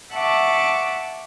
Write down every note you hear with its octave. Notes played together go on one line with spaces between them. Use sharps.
E5 F#5 A5 C#6 D6